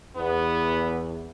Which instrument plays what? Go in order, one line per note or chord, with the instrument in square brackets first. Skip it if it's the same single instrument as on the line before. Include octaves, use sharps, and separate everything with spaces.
[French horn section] E2 [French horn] B3